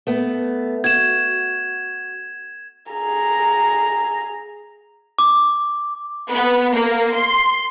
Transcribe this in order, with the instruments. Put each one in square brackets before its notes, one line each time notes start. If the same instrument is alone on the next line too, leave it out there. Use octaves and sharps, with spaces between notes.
[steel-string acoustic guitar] A3 B3
[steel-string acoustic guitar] F#4 [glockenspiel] G#6 E7
[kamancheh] G#4 A#5
[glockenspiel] D6
[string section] B3
A#3
C6